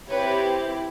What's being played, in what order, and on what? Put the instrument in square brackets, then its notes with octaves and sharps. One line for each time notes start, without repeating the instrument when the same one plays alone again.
[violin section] C4 E4 G4 B4 C#5